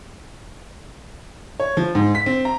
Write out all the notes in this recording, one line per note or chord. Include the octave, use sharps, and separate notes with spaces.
C#5
F3
G#2
B6
C4
A#5